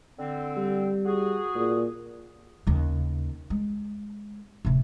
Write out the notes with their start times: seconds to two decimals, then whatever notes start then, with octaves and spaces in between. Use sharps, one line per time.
0.18 D3 C4
0.57 G3
1.05 F#4 G#4
1.55 A#2
2.67 D#2 C#3
3.50 G#3
4.65 D1 C3